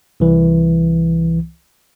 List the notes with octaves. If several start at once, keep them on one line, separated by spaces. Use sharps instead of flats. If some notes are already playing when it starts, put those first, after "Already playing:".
C2 E3